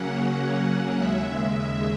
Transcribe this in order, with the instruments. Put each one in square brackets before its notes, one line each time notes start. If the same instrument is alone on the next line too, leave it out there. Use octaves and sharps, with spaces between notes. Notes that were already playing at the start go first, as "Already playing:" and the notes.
Already playing: [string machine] C#3 F#3 A#3 C#4 F#5
D#2 C#3 G#3 E5